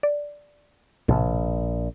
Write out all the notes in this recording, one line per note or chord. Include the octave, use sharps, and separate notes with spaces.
D5
A#1 A2 C3